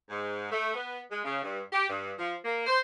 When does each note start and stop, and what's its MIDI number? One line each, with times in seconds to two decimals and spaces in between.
0.09 0.50 44
0.50 0.73 57
0.75 1.00 59
1.10 1.20 56
1.23 1.40 49
1.42 1.60 43
1.71 1.85 67
1.88 2.11 43
2.17 2.34 53
2.44 2.64 58
2.66 2.77 72